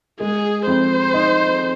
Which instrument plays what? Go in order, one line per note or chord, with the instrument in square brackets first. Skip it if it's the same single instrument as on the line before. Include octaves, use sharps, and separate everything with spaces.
[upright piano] G#3 [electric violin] G#4
[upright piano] F2 [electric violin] C5
[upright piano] D#4